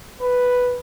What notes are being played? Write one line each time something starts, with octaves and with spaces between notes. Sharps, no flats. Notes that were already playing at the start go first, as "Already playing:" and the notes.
B4